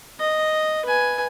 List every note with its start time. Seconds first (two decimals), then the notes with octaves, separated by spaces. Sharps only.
0.20 D#5
0.86 B4 G#5